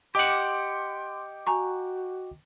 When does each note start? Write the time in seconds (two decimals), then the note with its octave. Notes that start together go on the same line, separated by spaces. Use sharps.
0.15 G4 D#5 F#5 G5 C6 D6
1.47 F#4 G#5 A#5 C#6